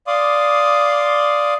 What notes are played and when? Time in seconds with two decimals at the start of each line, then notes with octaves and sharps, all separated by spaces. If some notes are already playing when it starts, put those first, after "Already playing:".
0.07 D5 F5 C6 D6 D#6